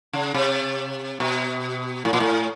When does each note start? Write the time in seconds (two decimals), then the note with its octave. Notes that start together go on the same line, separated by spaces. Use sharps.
0.13 C#3
0.34 C3
1.20 B2
2.05 A2
2.13 A#2
2.20 A2